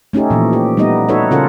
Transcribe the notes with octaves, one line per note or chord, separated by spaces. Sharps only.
A3 C#4 D#4 G4 A4
A#2 E3 F3
G4
G3 A3 B3 D#4 D#5
D#4 F#4 A4 B4 C#5 E5
C#3 C#4 F4 A4 A#4 F#5